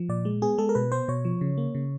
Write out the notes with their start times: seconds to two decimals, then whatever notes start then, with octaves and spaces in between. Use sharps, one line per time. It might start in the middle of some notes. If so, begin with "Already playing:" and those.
Already playing: F3
0.09 A#2 D5
0.25 G#3
0.42 B3 G#4
0.58 G#3 A4
0.69 A#4
0.75 B2 B4
0.92 B3 C5
1.08 B2 C#5
1.25 F3
1.41 C#3
1.57 A#3
1.75 C#3